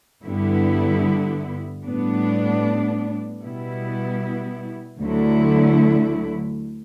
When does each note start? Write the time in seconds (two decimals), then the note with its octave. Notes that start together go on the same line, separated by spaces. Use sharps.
0.25 G2 D3 G3 B3 E4
1.84 A2 G3 B3 D4
3.42 B2 G3 B3 E4
5.02 D2 D3 F#3 A3 E4